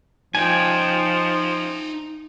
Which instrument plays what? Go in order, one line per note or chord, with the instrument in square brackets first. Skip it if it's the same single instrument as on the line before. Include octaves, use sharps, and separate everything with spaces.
[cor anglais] F3 [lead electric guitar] D#4 D5 [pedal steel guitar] G5 G#5